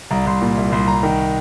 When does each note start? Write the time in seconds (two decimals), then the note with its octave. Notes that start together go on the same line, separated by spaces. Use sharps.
0.11 C2 A#5
0.26 C2 C6
0.42 A#2
0.57 C2
0.72 C2 C6
0.88 C2 A#5
1.03 D#3